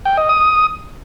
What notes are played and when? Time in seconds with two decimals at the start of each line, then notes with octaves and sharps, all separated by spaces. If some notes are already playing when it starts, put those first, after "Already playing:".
0.05 G5
0.17 D#5
0.29 D#6